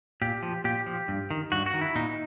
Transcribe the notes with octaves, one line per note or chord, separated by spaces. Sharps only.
A#2 G4
F3
A#2 G4
F3
G2
D#3
G2 F#4
F#4
D#3
E4
A#2 D#4